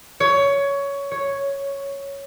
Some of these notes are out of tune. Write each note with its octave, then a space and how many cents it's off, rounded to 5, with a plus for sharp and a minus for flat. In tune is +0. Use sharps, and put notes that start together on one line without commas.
C#5 +15
C#5 +0